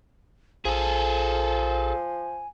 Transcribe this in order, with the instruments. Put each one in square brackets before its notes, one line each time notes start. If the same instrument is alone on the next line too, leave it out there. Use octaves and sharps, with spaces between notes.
[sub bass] A#1 [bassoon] F3 [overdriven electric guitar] G#4 A4 [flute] G#5